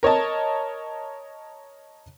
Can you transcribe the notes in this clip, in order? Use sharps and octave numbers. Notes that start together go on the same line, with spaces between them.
A#4 C#5 D#5 A5